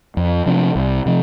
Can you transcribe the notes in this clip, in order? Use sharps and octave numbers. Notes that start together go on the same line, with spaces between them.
F2
C3 F3 D4
C2
C3 F3